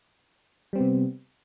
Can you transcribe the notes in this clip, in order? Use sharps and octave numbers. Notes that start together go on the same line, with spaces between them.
C3 G3 B3 C4